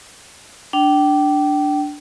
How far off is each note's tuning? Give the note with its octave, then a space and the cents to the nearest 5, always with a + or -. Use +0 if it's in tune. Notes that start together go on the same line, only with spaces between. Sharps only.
D4 +0 G5 -25